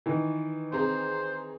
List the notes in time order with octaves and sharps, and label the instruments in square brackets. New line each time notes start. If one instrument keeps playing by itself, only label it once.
[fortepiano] D#3 E3
[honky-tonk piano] C4 G#4 A#5 [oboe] C5